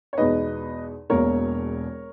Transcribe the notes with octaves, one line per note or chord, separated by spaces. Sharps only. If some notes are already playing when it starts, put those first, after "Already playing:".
C#5
E2 B2 G#3 D#4 B4 D#5
E1 E2 B2 A#3 A#4 C#5